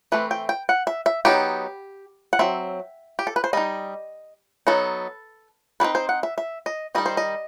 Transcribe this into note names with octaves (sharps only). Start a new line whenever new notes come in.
E3 A3 C4 B4
G5
G5
F#5
E5
E5
F#3 B3 D#4 G4
F#5
F#3 C4 E5
G4
A4
B4
C5
G3 D#4 D#5
F#3 B3 D#4 A4
G3 C4 D#4 B4
C5
F#5
E5
E5
D#5
D#3 G3 D#4 D#5
C5
D#5